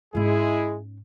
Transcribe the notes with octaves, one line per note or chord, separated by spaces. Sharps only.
G#2 G#3 C#4 E4 G#4